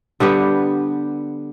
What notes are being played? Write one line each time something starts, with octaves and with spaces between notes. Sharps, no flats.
D3 G3 B3 G4